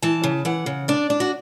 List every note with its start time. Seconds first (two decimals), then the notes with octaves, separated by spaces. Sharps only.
0.02 E3 A5
0.24 C#3
0.45 E3 F#5
0.66 C#3
0.88 D4 D5
1.10 D4
1.20 F#4